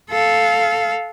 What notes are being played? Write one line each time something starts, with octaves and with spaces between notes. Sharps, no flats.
A4 F5